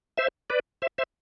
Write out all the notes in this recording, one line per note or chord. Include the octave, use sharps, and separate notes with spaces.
C5 E5
B4 D5
C5 E5
C5 E5